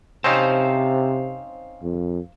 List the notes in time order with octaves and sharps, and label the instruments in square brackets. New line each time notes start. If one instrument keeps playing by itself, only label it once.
[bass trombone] C3 [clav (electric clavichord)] C4 C#4 D#4 [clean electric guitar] C5 F5 A5
[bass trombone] F2